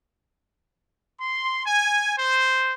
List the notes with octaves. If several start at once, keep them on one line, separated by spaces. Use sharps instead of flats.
C6
G#5
C5